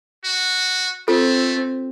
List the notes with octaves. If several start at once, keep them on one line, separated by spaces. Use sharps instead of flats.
F#4
A3 C4 F4 A4